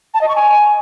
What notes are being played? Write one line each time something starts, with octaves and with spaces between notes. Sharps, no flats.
A5
D#5
C#6
G#5